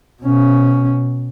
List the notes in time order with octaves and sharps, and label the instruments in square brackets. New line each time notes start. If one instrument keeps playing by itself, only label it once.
[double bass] B2 C#4